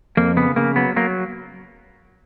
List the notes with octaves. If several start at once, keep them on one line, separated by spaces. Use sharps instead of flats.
F2 A#3
C#3 B3
C#3 A#3
F#3 B3
F#3 A#3